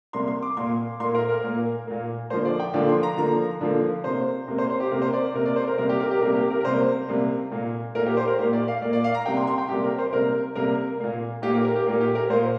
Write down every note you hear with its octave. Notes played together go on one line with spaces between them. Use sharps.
C3 G3 A#3 C6
C6
D6
A#2 A#3 C6
A#2 A#3 C6
A#4
A#4
A#2 A#3
A#2 A#3
D3 F3 A#3 C5
D5
G5
D3 F3 A#3 D5
C6
A#5
D3 F3 A#3 A#5
D3 F3 A#3
C3 A#3 C5
C3 A#3
C5
C5
G4
C3 A#3 A#4
C5
D5
C3 A#3 A#4
D5
C5
A#4
C3 G3 A#3 A#4
G4
A#4
G4
C3 G3 A#3 A#4
G4
A#4
A#4
C3 G3 A#3 C5
C3 G3 A#3
A#2 A#3
A#2 A#3 A#4
G4
C5
A#4
A#2 A#3 G4
D5
F5
A#2 A#3 D5
D5
F5
A#5
C3 G3 A#3 G5
C6
C6
G5
C3 G3 A#3 G4
A#4
C5
C3 G3 A#3 A#4
C3 G3 A#3 A#4
A#2 A#3
A#2 A#3 G4
A#4
A#4
G4
A#2 A#3 A#4
G4
A#4
A#2 A#3 C5